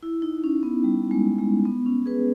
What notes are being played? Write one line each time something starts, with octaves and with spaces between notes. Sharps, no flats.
E4
D#4
C#4
B3
G3
G#3
G#3
B3
C#4
G#4 B4